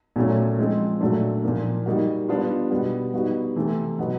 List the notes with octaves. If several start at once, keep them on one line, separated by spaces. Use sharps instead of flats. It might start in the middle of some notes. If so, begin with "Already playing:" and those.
A#2 F#3 A3 C#4
F3 G#3 C4
A#2 F#3 A3 D4
A#2 F3 A#3
G3 A#3 D#4 F#4
G3 B3 D4 F4
B2 G3 B3
G3 B3 D#4 F#4
C3 E3 A3 C4
B2 F#3 B3